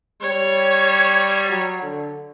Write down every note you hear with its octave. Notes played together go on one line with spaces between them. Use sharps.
G3 C#5
F#3
D3